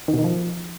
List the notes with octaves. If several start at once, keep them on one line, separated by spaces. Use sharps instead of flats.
D#3
B2
D#3
F3